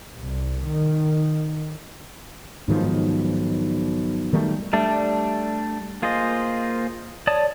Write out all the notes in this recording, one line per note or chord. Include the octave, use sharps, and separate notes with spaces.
C2
D#3
B1 G#2 D#3 F3
D#3 G3 A3
G3 A3 D4
A#3 F4 G#4 C5 D#5
C#5 D5 A5 D#6